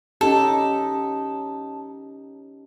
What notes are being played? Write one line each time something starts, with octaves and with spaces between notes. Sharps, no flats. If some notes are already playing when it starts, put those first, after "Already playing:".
C#4 D#4 G4 A4